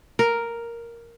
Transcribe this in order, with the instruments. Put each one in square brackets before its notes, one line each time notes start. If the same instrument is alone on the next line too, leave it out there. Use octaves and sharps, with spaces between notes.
[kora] A#4